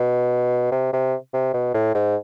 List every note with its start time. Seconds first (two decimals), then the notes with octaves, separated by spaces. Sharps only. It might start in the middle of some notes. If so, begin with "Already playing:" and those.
Already playing: B2
0.72 C3
0.93 C3
1.34 C3
1.54 B2
1.74 A2
1.94 G#2